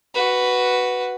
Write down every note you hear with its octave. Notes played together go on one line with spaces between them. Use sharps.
F#4 B4